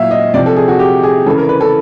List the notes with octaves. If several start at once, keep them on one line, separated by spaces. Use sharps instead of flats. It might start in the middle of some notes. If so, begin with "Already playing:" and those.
Already playing: A#2 F#3 E5 F5
D#5
C3 F3 D5
A4
G#4
F#4
G4
G#4
C#3 E3 A4
A#4
B4
A4